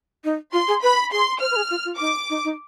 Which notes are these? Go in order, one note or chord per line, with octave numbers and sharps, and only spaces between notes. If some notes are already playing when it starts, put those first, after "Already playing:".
D#4
F4 C6
G#4
B4 B5
G#4 C6
C5 F6
B4
G#4
F4
F4
D#4 D6
D#4
D#4